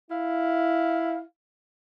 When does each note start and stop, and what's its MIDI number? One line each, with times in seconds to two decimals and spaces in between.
0.11 1.23 64
0.11 1.23 77